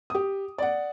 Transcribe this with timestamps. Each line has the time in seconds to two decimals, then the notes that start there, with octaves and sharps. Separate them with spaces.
0.10 G4 D#6
0.58 D5 F#5